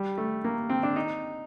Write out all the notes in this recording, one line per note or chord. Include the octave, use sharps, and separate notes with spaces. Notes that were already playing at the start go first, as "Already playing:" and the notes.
Already playing: G3
A3
A#3
C4
D4
D#4